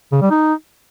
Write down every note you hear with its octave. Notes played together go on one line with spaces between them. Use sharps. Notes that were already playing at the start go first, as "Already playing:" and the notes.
C#3
G3
D#4